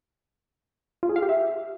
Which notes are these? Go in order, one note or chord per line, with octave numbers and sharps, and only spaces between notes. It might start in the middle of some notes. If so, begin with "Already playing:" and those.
F4
G#4
F5
G4
E5